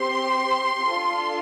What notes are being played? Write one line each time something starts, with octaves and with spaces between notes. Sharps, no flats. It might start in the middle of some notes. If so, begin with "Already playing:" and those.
Already playing: C4 G4 C6
D4 F4 A4